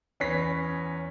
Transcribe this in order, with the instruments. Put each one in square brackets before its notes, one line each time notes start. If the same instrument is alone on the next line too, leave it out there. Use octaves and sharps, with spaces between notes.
[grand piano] E2 C#4 B4 A#6 B6